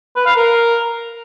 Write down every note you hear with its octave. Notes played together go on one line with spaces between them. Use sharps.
B4
F5
A#4